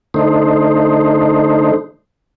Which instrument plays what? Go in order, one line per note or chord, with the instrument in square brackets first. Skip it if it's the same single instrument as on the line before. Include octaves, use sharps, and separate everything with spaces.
[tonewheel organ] D3 A3 D#4 C5